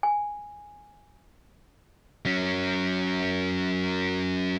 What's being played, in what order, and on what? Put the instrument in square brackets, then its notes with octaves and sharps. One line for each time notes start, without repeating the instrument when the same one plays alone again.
[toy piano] G#5
[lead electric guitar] F#3 C#4